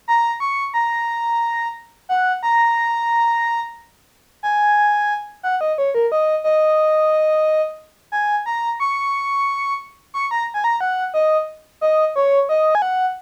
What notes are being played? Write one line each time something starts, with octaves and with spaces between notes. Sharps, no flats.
A#5
C#6
A#5
F#5
A#5
G#5
F#5
D#5
C#5
A#4
D#5
D#5
G#5
A#5
C#6
C#6
A#5
G#5
A#5
F#5
D#5
D#5
C#5
D#5
G#5
F#5